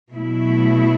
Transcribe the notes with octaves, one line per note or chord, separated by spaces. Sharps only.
B2 F#3 A3 E4